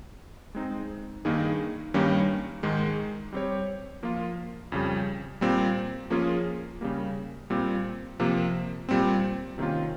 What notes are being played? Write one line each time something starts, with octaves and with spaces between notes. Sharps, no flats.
G#3 C4 D#4
G2 D#3 A#3 D#4 G#4
G2 D#3 G3 A#3 C#4
G#2 D#3 G#3
G3 C4 G4 C#5
F3 A#3 F4
F2 C#3 G3
A#2 G3 C4
F3 A#3 C#4 F4 G#4
C#3 G3 A#3
A#2 G3 C4
C3 F3 A#3
A#2 G3 C4
C3 D#3 A#3 C#4 F4